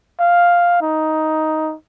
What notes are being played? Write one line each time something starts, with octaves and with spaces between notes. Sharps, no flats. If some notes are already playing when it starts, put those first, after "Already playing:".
F5
D#4